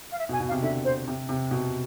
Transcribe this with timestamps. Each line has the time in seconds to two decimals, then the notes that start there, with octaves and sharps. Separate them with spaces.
0.12 F5
0.18 E5
0.29 B2
0.32 G#5
0.40 B2
0.48 F5
0.51 C3
0.62 D3 E5
0.84 C5
1.07 C3
1.29 C3
1.51 B2